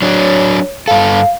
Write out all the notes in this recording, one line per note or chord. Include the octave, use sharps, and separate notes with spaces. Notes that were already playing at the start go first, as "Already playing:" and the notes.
F#3 D4 C#5
G2 A4 F5